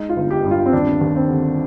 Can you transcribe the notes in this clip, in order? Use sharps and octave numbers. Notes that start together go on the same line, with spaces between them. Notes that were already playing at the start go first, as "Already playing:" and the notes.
Already playing: G#3 D#4
F4
G1
G4
G2
F4
C4
D#2 D4
D#2
C4
D3